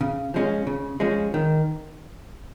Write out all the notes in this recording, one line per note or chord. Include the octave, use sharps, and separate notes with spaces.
C#3
F3 G#3 C#4
C#3
F3 G#3 C#4
D#3